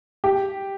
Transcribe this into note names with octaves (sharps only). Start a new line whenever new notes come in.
G4